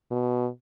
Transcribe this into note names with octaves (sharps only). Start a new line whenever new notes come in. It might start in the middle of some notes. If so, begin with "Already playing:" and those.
B2